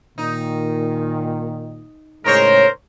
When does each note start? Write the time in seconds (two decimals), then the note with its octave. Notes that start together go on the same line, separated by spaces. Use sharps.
0.18 A#2 D#3 D#4
2.25 A2 C#3 G#3 D#4 A#4 C5 C#5